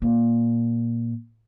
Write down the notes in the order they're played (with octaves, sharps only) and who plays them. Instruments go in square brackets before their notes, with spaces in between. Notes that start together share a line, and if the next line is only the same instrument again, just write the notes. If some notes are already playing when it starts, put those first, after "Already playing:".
[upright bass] A#2